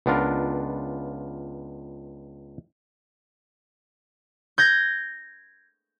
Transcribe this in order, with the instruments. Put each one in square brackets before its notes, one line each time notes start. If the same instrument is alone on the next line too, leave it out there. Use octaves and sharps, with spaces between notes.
[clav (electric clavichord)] C#2 B3 D4 F4 A#4
[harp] G6 G#6 A#6